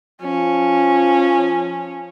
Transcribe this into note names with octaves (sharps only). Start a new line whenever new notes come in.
F3 C#4